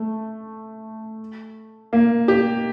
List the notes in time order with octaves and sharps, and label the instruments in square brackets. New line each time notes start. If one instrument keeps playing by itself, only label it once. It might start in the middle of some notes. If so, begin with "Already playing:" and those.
Already playing: [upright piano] A3
A#3
G4